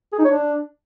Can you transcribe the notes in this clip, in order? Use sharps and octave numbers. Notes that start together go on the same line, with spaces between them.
G#4
D#4
C#5
D4